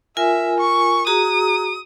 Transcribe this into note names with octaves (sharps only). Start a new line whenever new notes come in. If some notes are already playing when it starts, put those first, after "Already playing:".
F4 A#4 E5 G#5
C#6
F#4 G#4 A#5 D#6